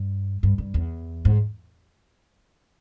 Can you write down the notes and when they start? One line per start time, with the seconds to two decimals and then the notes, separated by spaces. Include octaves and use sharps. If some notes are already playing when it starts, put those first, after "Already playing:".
Already playing: G2
0.43 G2
0.58 G2
0.74 E2
1.25 G#2